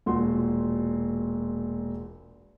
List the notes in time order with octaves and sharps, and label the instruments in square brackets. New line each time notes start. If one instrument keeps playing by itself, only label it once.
[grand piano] E1 A#2 F#4 C6